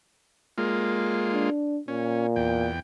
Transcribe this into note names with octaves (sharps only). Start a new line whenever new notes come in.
G#3 A#3 F4
D4
A#2 C#4
E2 G5